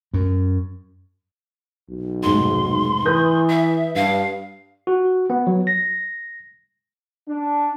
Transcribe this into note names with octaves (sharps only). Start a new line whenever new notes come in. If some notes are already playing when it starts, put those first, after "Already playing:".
F#2
B1
F1 G#2 C6
E3 B4 D#6 G6
E5
G2 F5
F#4
B3
F#3
A#6
D4